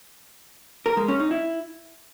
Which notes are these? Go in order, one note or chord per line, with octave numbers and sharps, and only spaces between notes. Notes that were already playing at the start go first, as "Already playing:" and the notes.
A#4
G#3
C#4
D#4
E4